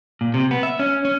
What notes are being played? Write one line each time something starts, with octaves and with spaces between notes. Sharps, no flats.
A#2
C3
B3
E5
C#4
C#4